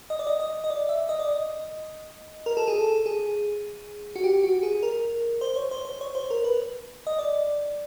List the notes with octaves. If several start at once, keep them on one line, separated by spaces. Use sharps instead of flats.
D#5
D5
D#5
D#5
D#5
D5
E5
D#5
D5
D#5
A#4
A4
G#4
A4
G#4
F#4
G4
F#4
G#4
A#4
C5
C#5
C5
C5
C#5
C5
A#4
B4
D#5
D5